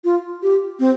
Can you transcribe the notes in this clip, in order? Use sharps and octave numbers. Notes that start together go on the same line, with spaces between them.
F4
G4
C4